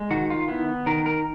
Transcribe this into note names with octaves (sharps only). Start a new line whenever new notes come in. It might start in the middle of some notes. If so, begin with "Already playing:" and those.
Already playing: G#3
D#3 F#4
F4
B3 E4
D#3 A#4
A#4